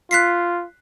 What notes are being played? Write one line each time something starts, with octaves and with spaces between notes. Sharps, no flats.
F4 F#6 B6 C7